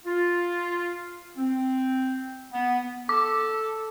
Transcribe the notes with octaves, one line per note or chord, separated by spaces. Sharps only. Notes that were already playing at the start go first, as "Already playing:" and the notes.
F4
C4
B3
A4 D6